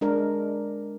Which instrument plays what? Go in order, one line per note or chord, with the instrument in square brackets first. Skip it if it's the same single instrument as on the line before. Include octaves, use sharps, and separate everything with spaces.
[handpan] G#3 D4 A#4